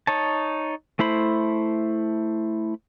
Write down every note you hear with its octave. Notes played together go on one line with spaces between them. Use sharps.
D#4 C#5 A5
A3 E4 C5 B5